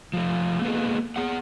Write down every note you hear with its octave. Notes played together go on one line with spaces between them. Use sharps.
F3 A3
A#3 B3 G#4 A4
B3 G#4 F#5